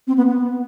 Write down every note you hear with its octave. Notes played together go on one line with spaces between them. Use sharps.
C4
B3
B3